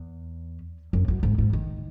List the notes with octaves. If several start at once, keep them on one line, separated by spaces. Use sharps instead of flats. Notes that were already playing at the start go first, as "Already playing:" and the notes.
Already playing: E2
F#2
F#2
G#2
G#2
D#3